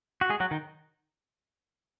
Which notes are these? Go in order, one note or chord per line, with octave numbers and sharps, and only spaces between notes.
F#4
G#3 G#4
F#3 F#4
D#3 D#4